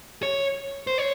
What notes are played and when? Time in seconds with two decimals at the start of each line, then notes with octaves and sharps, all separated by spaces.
0.23 C#5
0.87 C5
0.98 C#5